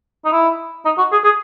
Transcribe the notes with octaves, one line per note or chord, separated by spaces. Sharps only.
D#4
E4
D#4
F#4
G#4
G#4